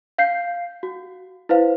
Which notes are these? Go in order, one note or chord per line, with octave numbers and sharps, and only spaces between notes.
F5 G6 C7
F#4
E4 B4 C5 F5